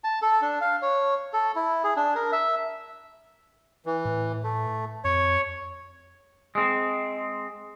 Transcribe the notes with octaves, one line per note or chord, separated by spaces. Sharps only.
A5
A4
D4
F5
C#5
A4
E4
G#4
D4
A#4
E5
E3
A2
A3
F2 C#5
G#3 C4